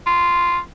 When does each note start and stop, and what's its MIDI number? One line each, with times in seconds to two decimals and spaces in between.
0.06 0.59 65